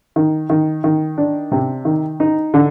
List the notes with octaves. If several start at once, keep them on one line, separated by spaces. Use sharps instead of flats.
D#3
D#3
D#3
D4
C3
D#3
D#4
D3